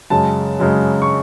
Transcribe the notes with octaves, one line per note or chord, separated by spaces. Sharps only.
F#2 C#3 G#3 A5
F#2 C#3 G#3
C#6